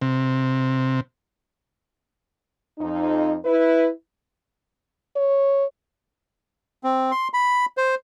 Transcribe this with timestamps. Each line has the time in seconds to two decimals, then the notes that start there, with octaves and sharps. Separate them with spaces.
0.02 C3
2.78 F2 D#4
3.45 E4 B4
5.16 C#5
6.84 C4
7.11 C6
7.34 B5
7.77 C5